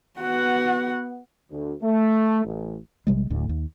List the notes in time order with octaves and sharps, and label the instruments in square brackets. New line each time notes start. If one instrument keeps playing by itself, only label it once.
[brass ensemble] B3 [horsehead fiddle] F#4 F#5
[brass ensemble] D2
A3
A1
[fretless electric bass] A#1 C3 G3 G#3
D1 D2 A2
D#2